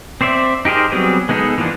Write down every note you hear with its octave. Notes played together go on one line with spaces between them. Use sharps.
C4 C5 D5 E5
D#4 G4 G#4 A#4 C5
F#3 G3 B3 C4 G#4
G#3 B3 D#4 G#4 A4
E3 F3 A#3 B3 D4